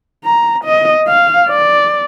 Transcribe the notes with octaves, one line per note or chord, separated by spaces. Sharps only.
A#5
D#5
F5
D5